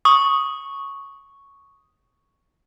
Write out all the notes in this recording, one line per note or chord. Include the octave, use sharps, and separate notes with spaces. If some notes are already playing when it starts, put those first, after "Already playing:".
C#6 D#6